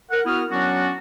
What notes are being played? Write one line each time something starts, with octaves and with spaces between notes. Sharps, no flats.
A#4 F#5
B3 E4 F#4 D#6 F6
F#3 B3 C#4 D4 F#4